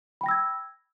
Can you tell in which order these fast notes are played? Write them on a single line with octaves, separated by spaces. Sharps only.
B5 G5 A#6 E6 G#6